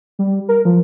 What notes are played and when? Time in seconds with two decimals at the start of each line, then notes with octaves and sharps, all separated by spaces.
0.19 G3
0.49 A#4
0.65 F3